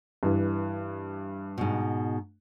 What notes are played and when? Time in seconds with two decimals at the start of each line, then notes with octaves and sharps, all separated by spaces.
0.23 G2 E3
1.58 G#2 B2